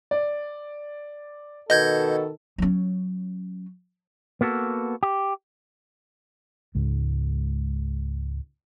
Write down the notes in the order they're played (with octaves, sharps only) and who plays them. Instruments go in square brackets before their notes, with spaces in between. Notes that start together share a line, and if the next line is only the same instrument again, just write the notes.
[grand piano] D5
[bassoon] B2 [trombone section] D#3 A4 [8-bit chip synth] D#5 G6 G#6
[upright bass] F#3 C#4
[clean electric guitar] A#3 B3 F#4 G#4 A4
G4
[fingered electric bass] C#2 G#2